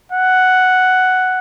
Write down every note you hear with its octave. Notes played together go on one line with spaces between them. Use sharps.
F#5